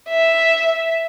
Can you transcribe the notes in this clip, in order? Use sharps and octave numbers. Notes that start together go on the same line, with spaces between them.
E5